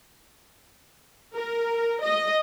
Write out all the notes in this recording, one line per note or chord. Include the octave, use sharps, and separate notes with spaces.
A#4
D#5